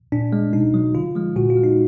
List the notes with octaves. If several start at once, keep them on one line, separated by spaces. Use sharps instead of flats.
A#2 D4
G#3
B2 D#4
F#3
D3 F4
F3 G#3
A#2 F#4
F4
G#3
D#4